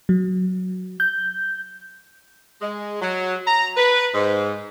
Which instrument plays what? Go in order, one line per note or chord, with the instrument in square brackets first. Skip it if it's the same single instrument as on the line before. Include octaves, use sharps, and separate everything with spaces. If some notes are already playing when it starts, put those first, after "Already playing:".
[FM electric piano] F#3
G6
[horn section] G#3
F#3
A#5
B4
G#2